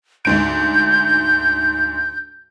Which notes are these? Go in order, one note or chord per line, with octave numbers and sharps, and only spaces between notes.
D2 G#2 G6 D7